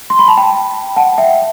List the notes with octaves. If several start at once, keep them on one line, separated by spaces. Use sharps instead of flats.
C6
B5
A5
G5 B5
F#5 A5
E5 G5